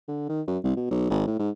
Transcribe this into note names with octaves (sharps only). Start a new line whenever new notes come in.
D3
D#3
F#2
C2
B2
B1
G#1
A2
G#2